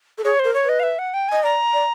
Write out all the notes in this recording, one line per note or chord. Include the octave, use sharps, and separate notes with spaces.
A4
G#4 C#5
A#4 C5
C#5
B4 D#5
F5
E5
F#5
G5
D#5 G#5
D5 A#5
D5